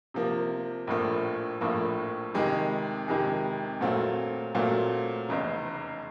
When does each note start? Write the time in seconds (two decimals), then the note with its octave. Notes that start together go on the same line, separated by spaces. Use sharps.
0.14 C3 F3 A#3
0.87 A#1 A2 F3 A#3
1.61 A#1 A2 F3 A#3
2.34 F2 C3 D#3 G#3
3.08 F2 C3 D#3 G#3
3.81 A#2 F#3 A3 C4 F4
4.55 A#2 F#3 A3 C4 F4
5.29 F1 E2 C#3